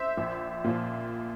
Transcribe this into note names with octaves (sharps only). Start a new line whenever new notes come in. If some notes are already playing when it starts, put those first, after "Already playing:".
Already playing: C5 E5
A#1
A#2 F3